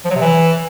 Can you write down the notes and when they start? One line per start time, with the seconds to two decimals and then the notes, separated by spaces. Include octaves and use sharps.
0.05 F3
0.10 F#3
0.16 C3
0.21 E3